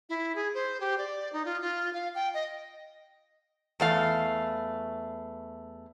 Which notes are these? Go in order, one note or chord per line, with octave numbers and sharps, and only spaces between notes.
E4
G#4
C5
G4
D5
D#4
F4
F4
F5
G5
D#5
E2 A3 F5